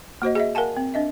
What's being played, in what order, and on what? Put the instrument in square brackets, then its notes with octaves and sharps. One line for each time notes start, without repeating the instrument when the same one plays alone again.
[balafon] A#3 F#4 C5 D#5
G#4 D#5 E5
A#4 F5 F#5 G#5 A5
C4
D4 D#5 E5